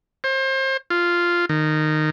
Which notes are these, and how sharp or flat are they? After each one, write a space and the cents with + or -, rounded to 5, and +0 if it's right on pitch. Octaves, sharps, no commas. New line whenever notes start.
C5 +30
F4 -5
D#3 -15